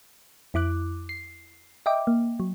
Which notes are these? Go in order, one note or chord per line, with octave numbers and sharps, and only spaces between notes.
F2 E4 D6 F#6
C7
D#5 E5 G5 D6
A#3
F#3